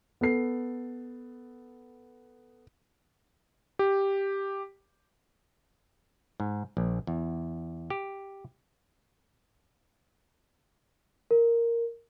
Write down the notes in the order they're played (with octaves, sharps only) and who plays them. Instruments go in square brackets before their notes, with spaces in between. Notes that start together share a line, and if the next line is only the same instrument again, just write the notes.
[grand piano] B3 A4 C7
[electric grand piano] G4
[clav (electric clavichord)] G#2
A#1
E2
G4
[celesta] A#4